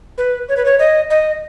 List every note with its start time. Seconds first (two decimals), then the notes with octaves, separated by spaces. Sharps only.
0.18 B4
0.49 C#5
0.57 B4
0.65 C#5
0.79 D#5
1.10 D#5